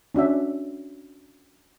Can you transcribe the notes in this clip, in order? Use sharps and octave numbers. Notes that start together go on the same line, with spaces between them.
C#4 D4 F#4 E5